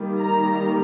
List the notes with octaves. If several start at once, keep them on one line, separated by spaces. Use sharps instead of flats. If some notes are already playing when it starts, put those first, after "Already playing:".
Already playing: D#3 G3 A#3
A#5